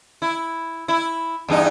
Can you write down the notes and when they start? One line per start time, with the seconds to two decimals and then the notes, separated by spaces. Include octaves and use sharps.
0.22 E4
0.88 E4
1.48 E2 G2 D#4